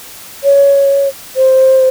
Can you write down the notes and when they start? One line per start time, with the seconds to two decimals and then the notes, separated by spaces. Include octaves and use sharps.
0.44 C#5
1.36 C5